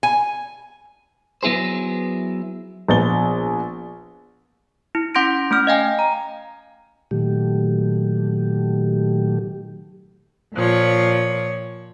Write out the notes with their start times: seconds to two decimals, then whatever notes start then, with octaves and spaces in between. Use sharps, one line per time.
0.03 G#5
1.43 F#3 B3 E4 G#4 C5
2.88 A#1 B3 A6 G7
4.95 E4
5.15 C#4 F#5 C6 G6 A#6 D7
5.51 A3 C#4 F6
5.67 D#5 F5 G5 G#5
5.99 A#5
7.11 A#2 D#3 F#3 A3 G4
10.55 A#2 F3 C#5